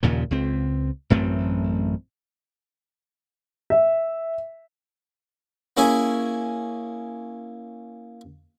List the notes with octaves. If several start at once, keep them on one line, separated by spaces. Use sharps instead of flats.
D#2 A#2 C#3 F3
C#2 C4
A1 F#2 A3 C4
E5
A#3 C#4 E4 G#4 G#5